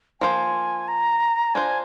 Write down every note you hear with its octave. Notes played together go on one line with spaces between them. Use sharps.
F3 A#3 F4 C5 G#5
A#5
D4 F4 C5 G#5